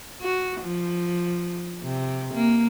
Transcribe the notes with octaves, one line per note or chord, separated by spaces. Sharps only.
F#4
F3
C3
A#3